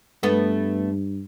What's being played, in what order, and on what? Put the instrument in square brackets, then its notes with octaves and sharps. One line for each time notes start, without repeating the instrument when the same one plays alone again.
[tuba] G2 [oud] A3 B3